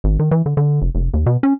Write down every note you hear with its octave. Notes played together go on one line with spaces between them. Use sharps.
G#1
D#3
E3
D3
D3
F1
F1
D#2
B2
C#4